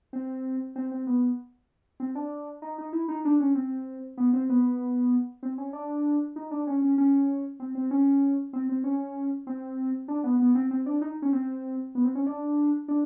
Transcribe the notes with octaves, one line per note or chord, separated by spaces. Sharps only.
C4
C4
C4
B3
C4
D4
D#4
D#4
E4
D#4
D4
C#4
C4
B3
C4
B3
C4
C#4
D4
D#4
D4
C#4
C#4
C#4
C4
C4
C#4
C4
C4
C#4
C4
D4
B3
B3
C4
C4
D4
D#4
C#4
C4
B3
C4
C#4
D4
D4